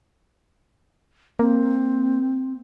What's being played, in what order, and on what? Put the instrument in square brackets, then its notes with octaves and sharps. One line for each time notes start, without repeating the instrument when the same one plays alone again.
[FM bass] A#3 [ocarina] C4